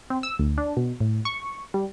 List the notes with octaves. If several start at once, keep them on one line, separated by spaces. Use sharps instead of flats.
C4
E6
D2
D4
B2
A2
C#6
G3